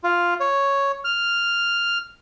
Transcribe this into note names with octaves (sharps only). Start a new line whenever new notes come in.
F4
C#5
F6